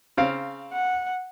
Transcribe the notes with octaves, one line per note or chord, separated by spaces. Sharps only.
C#3 C4 F5
F#5